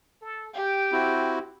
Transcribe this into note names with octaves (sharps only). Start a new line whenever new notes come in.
A4
G4 G5
C4 E4 F#4